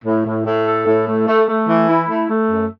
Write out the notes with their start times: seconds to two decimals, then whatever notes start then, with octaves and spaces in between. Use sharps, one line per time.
0.05 A2
0.25 A2
0.46 A2
0.66 A4
0.86 A2
1.07 A3
1.28 A3
1.48 A3
1.68 E3
1.89 E4
2.09 A3
2.30 A3
2.50 F#2